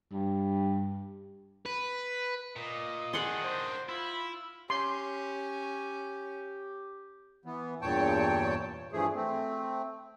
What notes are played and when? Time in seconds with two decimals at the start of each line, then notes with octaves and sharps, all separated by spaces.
0.12 G2
1.66 B4
2.56 A#2 D#5
3.13 D#3 D4 G#4 F#5 C6
3.44 C5
3.89 E4 F4 B5
4.70 C#4 G4 C6
7.45 E3 B3
7.82 E2 G2 A#2 C#5 G5 A5
8.93 G2 E3 F3 A3 G#4
9.15 A3 C4